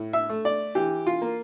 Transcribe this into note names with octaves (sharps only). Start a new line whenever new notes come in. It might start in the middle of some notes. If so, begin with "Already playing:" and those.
Already playing: A2
E5
A3
D5
E3 G4
F4
A#3